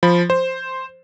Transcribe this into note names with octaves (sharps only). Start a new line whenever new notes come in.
F3 B5
C5